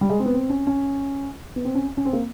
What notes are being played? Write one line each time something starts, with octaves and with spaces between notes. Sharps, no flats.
G3
G#3
C4
B3
C4
C#4
C#4
B3
C4
C#4
C#4
C4
A#3